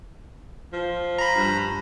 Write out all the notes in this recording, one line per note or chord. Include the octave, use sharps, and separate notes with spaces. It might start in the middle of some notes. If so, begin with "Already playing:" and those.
F3
A#5 B5
G2